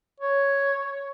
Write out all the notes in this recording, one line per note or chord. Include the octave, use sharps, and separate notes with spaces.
C#5